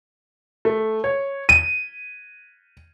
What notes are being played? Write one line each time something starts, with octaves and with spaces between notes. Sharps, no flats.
A3
C#5
D#7